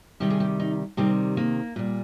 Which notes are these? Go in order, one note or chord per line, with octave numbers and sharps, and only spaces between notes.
C3 D#3 G3 G4
G#4
G4
D#4
C3 D#3 G3 C4
A#3
A#2 G3